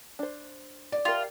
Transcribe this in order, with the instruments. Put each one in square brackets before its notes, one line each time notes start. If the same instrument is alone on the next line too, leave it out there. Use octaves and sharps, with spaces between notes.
[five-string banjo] D4 C5
[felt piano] D5
[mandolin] F4 [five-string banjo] G4 A#4